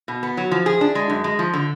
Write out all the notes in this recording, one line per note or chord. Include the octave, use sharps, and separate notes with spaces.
B2
B3
F#3
F3
G#4
D4
G#3
F#2
G#3
F3
D3